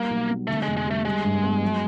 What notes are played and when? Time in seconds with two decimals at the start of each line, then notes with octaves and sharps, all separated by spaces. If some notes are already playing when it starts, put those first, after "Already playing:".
Already playing: G3 A#3
0.10 B1
0.29 B3
0.47 D3 A3
0.63 F1 G#3
0.77 G#3
0.86 G3 A3
1.05 G3 G#3
1.24 G2
1.43 B3
1.62 F#3